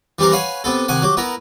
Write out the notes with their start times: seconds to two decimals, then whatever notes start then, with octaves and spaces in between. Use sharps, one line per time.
0.19 E3 G3 C4 G4 A#4
0.32 B4 C#5 F5 F#5 G#5
0.64 C3 B3 A4
0.88 C3 D#3 F#5 G#5
1.02 F#3 G4
1.17 B3 E4 A#4